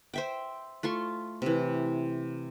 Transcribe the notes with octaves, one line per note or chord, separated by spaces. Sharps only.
C5 E5 G5
A3 F4 C6 C#6
C3 E3